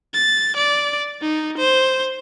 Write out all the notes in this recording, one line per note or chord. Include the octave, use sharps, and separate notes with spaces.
A6
D5
D#4
C5